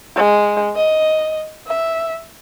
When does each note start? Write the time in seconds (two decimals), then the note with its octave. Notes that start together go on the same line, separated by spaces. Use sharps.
0.16 G#3
0.76 D#5
1.67 E5